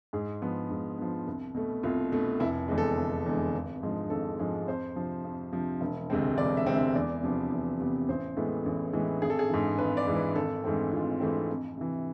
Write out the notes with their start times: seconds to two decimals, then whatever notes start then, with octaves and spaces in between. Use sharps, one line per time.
0.13 G#2 G#4
0.42 F3 B3
0.70 G#2
0.98 F3 B3
1.27 C2
1.54 B2 A3
1.83 C2 F4
2.12 B2 A3
2.40 F1 E4
2.68 E2 D3 G#3
2.78 A4
2.97 F1
3.26 E2 D3 G#3
3.54 G#1
3.83 G#2 F3 G#3
4.10 G#1 A4
4.39 G#2 F3 G#3
4.67 F2 C5
4.96 C3 F3
5.24 F2
5.52 C3 F3
5.81 E1
6.10 D2 C3 G#3 C4
6.37 E1 D5
6.57 E5
6.66 D2 C3 G#3 C4
6.75 E5
6.95 E2 D5
7.23 C3 F3 B3
7.51 E2
7.80 C3 F3 B3
8.08 A1 C5
8.36 A2 E3 G#3 B3
8.66 A1
8.93 A2 E3 G#3 B3
9.22 G#1 G#4
9.30 A4
9.39 G#4
9.50 G#2 E3
9.78 G#1 B4
9.97 D5
10.07 G#2 E3
10.16 B4
10.36 G#1 A4
10.64 G#2 E3 A3 C4
10.92 G#1 F4
11.20 G#2 E3 A3 C4
11.49 F2
11.77 C3 E3